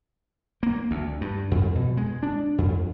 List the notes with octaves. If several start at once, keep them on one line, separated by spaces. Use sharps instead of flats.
A#3
D2
G2
F2
B2
G#3
D4
F2